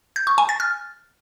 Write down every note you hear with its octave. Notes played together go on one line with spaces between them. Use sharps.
G6
C#6
G#5
A6
F6